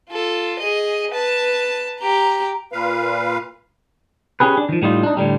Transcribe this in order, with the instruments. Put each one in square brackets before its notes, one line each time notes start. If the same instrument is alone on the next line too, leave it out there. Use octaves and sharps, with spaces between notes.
[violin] F4 A4
G#4 D#5
B4 A5
G4 A#5
[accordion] A#2 B4 F5
[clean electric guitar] C#4 G4 G#4 B4
D4
D#3 F3
A2 G3 D#4 F4
D4 D#4
A2 D3 G3